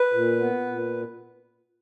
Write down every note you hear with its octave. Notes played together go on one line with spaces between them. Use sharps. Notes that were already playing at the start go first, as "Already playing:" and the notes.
Already playing: B4
A#2
B3
A#2